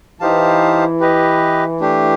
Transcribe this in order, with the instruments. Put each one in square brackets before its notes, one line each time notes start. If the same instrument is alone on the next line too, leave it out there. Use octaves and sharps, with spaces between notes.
[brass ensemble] E3 [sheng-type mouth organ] D#4 G4 C5 F5 A5
[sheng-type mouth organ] G4 B4 D#5
A3 D4 G4